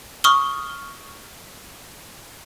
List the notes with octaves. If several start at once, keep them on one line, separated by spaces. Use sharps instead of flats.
C#6 D#6 F6 G7